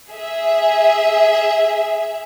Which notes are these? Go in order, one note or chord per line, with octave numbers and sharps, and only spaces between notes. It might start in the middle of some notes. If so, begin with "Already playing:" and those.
G#4 E5